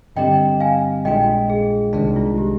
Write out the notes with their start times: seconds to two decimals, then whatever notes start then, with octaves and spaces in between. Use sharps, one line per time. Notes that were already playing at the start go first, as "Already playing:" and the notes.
0.16 G2 D3 G3 C4 G4 D#5 G5
0.60 F5 G#5
1.05 A#1 A#2 G#3 D4 F4 D#5 G5
1.50 G#4
1.93 C2 C3 D#3 G#3 D4 G#4
2.16 F4
2.38 G4